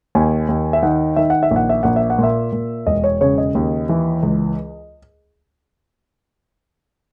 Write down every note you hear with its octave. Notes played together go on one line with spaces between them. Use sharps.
D#2 G#5
D#2
E5
D#3 F#5
D#3 E5
F#5
E5
A#1
F#5
E5
A#1 F#5
E5
F#5
A#2 E5
A#2
E1 D#5
C#5
C#3 C#5
D#5
D#2
E3
C#2